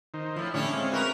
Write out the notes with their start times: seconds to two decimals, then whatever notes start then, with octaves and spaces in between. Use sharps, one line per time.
0.14 D#3 D#4 C5
0.36 A2 F3 E4
0.54 A2 D3 C#4 D4 E4 G4
0.73 G#3 C4 F5
0.92 F#4 A#4 B4